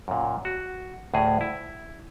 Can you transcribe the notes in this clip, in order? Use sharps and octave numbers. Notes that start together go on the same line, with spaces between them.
F#2 A#2
F#4
D2 A2 G#4
E4